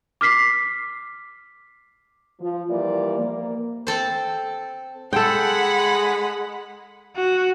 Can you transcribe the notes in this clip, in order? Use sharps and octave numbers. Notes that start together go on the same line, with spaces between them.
D6 F6 B6 C7
F3
E3 F3 G3 A#3 D5
A#3
C4 A4 C5
G#3 A4 F#5 G5 B5
F#4